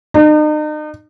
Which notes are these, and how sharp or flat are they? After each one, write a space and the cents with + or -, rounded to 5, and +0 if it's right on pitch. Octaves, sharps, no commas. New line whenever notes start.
D#4 -40